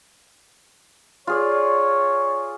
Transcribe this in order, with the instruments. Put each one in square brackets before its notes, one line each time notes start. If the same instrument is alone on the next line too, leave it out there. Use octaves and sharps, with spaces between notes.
[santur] F4 G#4 D5 [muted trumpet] C#5